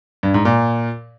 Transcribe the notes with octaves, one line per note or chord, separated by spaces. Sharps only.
G2
G#2
A#2